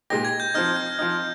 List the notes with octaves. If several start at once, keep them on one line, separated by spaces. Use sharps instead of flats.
A#2 G#3 D#4 G4 A#6
G#6
G6
F3 C4 D#4 F6
G6
F3 C4 D#4